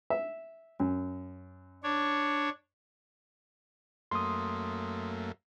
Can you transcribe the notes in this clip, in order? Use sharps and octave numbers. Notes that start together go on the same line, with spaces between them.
E5
F#2
D4 C#5
F#2 A3 A#3 C6 D#6